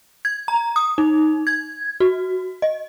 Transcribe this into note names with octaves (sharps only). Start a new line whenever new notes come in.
G#6
A#5
D#6
D#4
G#6
F#4
D#5